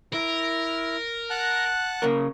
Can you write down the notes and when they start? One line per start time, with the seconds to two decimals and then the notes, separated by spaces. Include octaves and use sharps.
0.13 E4 A#4
1.30 F#5 A5 F#6
2.02 C#3 A#3 A#4